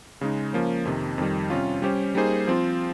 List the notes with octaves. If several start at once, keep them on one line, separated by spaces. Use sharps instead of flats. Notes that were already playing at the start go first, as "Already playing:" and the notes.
C#3 G#3 D#4
F3 A#3 C#4
F2 C3 D#3
F2 D#3 G3
C3 G3 C#4 F4
G3 C#4 G4 C5
G3 A#3 D#4 G#4 C5
F3 C4 F4